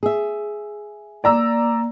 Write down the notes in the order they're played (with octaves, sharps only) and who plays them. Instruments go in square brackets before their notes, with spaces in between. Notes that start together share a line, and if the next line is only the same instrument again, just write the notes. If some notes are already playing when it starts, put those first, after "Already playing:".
[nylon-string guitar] G#4 E5
[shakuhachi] A#3 [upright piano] D5 A#5 E6